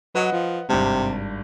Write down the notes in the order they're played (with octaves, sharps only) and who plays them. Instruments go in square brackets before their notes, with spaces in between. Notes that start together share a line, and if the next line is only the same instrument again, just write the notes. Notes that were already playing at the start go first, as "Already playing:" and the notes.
[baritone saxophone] F#3 [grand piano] B4 D#5 F#5
[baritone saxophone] F3
[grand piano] G#1 G2 [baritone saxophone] C3